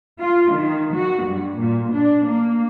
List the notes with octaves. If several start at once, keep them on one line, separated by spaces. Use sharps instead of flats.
F4
D#3
F#4
G2
A#2
D4
A#3